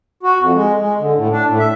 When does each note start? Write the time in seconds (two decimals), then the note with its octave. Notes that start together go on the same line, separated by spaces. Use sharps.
0.23 F#4
0.39 F2
0.55 G#3
0.78 G#3
0.98 D3
1.16 A2
1.32 D4
1.46 A2
1.58 E5